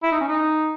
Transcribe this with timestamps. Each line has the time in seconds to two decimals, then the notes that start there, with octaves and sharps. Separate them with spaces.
0.03 E4
0.11 D#4
0.20 C#4
0.28 D#4